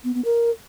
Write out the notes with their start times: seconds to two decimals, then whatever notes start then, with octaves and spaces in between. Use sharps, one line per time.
0.04 B3
0.14 B3
0.25 A#4